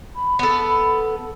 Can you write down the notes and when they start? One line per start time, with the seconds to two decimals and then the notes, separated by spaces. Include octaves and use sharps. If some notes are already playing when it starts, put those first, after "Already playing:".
0.15 B5
0.39 B3 A4